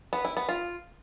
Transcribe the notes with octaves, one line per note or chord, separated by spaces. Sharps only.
B3
E4
B3
F4